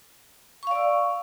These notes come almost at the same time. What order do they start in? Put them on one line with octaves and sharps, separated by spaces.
C#6 F5 D5 E6